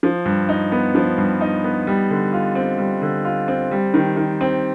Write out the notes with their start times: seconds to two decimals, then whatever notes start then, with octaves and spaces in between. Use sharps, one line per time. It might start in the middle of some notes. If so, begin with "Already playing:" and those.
0.03 F3
0.25 G2
0.49 D#4
0.72 B3
0.95 F3
1.18 G2
1.41 D#4
1.64 B3
1.87 G3
2.10 D3
2.33 F4
2.55 C4
2.78 G3
3.02 D3
3.25 F4
3.48 C4
3.71 G3
3.94 D#3
4.16 D#3
4.41 C4